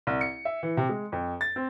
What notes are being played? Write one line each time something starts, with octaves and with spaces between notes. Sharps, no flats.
C2
C#7
E5
E3
C3
G#3
F2
A6
C4